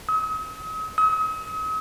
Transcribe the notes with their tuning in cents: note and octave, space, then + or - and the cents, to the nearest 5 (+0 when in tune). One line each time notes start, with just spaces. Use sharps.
D#6 +45
D#6 +45